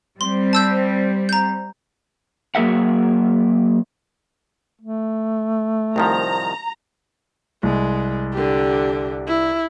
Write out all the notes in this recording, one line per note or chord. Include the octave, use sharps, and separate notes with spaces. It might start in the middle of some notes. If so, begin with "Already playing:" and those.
G3 C4 C6
A5 E6 G6
A#5 G6
F#3 A#3 G#4 A#4 E5 F#5
A3
C2 D#3 F3 A#5
C2 G#3
D3 G4
E4